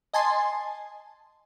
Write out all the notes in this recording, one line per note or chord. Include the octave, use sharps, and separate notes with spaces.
D#5 G#5 A5 C6